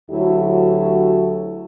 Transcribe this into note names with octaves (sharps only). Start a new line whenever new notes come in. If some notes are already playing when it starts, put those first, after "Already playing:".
D2 F#3 E4 F#4 G4 A4